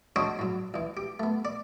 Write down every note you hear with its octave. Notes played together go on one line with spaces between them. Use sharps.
D4 F#4 G#4 C5 C#5 D#5
G#2 F#3
C#2 E3
G4
A3 B3
D5